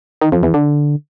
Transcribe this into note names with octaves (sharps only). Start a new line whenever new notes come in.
D#3
F2
E2
D3